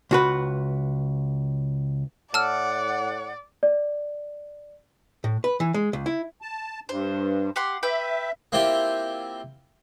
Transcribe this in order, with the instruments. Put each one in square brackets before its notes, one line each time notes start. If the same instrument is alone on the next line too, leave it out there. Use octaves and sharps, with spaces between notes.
[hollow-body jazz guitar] C#2 F#4 B4
[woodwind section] A2 F#5 [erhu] D5 [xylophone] A5 E6 F6
[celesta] D5
[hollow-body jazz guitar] A2
B4
E3
G#3
C#2
E4
[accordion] A5
[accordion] G2 [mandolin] C5
[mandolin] G4 F#5 C6
[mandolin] B4 G5 [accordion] E5
[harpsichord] A#3 C4 E4 F4 G4 G5